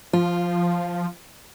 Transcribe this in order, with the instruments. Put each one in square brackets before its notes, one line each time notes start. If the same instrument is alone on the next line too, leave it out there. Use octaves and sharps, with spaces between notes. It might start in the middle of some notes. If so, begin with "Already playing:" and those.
[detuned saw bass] F3 [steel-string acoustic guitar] F4